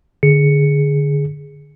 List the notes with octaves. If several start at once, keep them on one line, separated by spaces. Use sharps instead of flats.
D3 G#4 C#7